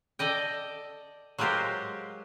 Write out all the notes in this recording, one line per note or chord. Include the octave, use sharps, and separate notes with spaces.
A4 D5 D#5 G5
F#3 G#3 F4 G4 A#4 C5